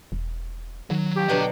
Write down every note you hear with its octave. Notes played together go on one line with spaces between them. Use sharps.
E1
D#3 F#3
G4
B2 D3 F#3 G5 A#5